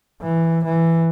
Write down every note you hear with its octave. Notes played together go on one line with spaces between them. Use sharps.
E3
E3